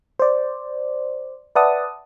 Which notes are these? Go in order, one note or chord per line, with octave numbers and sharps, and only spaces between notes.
C5 D5
B4 D5 E5 F#5 A5 D#6